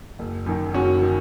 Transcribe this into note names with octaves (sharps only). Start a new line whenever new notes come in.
F#1
F#2 D#3
F#1 C#4 F#4
D#3